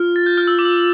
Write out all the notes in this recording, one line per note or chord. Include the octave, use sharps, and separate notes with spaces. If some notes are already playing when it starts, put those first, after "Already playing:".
Already playing: F4 F6
A6
G6
F6
E6
D6
E6